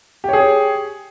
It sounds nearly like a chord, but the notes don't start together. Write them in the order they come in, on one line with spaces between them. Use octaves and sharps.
G4 C#5 G#4